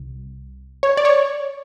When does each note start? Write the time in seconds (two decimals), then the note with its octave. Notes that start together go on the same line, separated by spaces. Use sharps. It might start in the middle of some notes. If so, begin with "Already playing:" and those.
Already playing: C2
0.83 C#5
0.97 D5
1.05 C#5